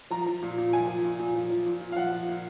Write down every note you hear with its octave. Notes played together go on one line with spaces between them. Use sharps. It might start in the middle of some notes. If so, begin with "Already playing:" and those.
F3 A#5
F3
A#2
A#2
F3 G#5
F3
A#2
A#2
F3
F3
A#2
A#2
F5
F3 F#5
F3
A#2